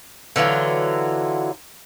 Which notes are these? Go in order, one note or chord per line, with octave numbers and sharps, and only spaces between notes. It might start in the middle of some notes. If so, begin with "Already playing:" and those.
D3 E3 F#3 F4